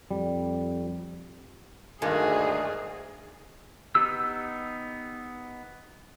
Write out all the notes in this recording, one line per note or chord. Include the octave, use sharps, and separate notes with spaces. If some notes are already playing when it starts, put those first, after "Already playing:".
F2 G3
D2 G2 D#3 G#3 A#3 G#4
B3 D#4 G4 E6